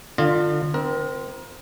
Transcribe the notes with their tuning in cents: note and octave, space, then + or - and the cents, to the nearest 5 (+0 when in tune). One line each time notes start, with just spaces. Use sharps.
D3 +30 F4 +0 D#5 -40
C4 -10 A#4 +30